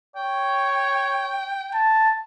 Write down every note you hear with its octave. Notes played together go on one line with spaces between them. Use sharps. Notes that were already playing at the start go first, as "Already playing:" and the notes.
C#5 G5
A5